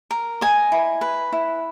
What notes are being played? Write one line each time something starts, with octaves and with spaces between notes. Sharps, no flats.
A#4
D#5 G#5
E4
B4
E4